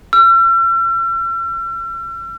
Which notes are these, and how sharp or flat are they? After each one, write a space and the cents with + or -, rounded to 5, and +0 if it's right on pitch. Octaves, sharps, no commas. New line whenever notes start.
E6 +45